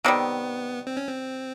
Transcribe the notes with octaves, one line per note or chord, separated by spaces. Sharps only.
C3 D#3 G3 B3
C4
C#4
C4